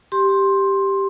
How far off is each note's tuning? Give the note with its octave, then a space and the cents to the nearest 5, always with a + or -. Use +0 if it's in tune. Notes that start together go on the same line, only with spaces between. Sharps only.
G4 +0 C6 +15